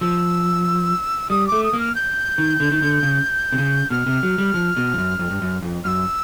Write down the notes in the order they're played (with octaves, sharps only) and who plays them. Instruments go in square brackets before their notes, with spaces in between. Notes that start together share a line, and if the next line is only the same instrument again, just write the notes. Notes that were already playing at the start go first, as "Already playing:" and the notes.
[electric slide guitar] F3 [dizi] E6
[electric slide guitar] G3 [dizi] D#6
[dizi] D6
[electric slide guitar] A3
[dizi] D#6
[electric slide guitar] A#3
[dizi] F6
G6
[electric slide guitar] D#3
D3
D#3
D3
C#3
C3
C#3
[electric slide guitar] B2 [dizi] F6
[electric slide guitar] C3
F#3
G3
F3
B2
F2
F#2
F2
G2
F#2
F2
[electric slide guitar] F#2 [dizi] E6 F6